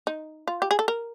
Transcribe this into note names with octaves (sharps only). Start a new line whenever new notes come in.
D#4
F4
G4
G#4
A4
A#4